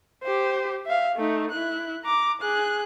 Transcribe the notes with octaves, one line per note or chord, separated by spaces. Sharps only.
G4 C5
E5 F5
A3 D#4
E4 F#6
A#5 D6
G#4 F#6